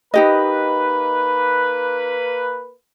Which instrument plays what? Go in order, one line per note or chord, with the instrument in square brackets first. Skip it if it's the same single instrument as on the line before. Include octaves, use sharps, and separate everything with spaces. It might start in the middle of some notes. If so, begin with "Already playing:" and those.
[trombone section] A#3 B4 [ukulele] D#4 G4 D#5